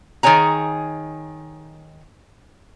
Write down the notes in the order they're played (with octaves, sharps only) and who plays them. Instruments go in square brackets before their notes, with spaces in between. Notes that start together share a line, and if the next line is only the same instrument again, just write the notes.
[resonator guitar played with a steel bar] D#3 G#4 C#5 G#5 A#5